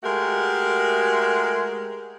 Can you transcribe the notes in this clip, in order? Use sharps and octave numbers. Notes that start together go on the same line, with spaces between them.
G#3 A3 F#4 G4 A#4